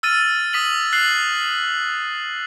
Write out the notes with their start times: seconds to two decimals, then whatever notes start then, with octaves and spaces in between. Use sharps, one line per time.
0.03 E6 F6 A6 D#7
0.53 D#6 B6 D#7 F#7
0.92 F#6 C7 F#7